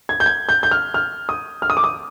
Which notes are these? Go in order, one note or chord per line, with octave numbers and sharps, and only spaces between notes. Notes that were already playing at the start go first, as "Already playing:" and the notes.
G#6
G6
G#6
G6
G6
F6
F6
D#6
F6
D#6
D6
D#6